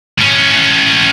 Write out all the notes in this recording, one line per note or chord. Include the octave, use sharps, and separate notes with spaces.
A2 C#4